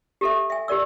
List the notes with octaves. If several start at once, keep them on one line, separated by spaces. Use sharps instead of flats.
G4 A4 E5
E5 G#5
G4 A#4 D5 E6